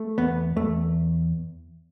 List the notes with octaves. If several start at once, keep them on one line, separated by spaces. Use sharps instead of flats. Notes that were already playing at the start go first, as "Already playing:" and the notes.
Already playing: A3
E2 B3
E2 A3